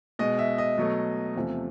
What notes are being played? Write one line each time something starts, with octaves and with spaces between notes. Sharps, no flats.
B2 G#3 D#5
E5
D#5
B2 F#3 A3
E2 C3 F3 A3